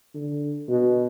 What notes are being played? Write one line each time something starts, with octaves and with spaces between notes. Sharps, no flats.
D3
B2